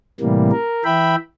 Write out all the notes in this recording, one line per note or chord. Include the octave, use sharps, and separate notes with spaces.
A2 C3 E3 G3 A#3
A#4
E3 E5 G5 B5